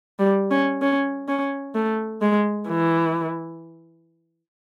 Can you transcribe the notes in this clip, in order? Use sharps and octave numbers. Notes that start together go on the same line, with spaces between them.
G3
C#4
C#4
C#4
A3
G#3
E3